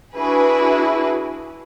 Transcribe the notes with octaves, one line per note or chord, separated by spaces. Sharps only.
D4 E4 F#4 G#4 B4